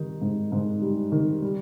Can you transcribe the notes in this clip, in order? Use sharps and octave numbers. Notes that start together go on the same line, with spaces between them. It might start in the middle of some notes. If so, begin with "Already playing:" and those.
Already playing: D#3 G3 D#4
G#2
G#2
G3
D#3
G3